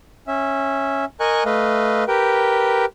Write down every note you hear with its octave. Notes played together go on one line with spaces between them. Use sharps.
C#4 E5
A#4 D#5 G#5 C#6 F#6
A3 B4 D#5 F5
G4 A#4 B4 G5